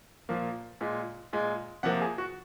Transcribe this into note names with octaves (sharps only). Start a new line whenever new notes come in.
A#2 F3 A#3
A#2 G#3
A#2 G#3
C3 F3 A#3 F#5
G#4
F#4